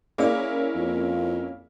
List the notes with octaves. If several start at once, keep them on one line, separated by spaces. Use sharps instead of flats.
A#3 C#4 E4 G#4 D5 E6
F2